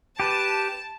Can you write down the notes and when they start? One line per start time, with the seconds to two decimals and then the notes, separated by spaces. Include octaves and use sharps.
0.20 G4 B4 A5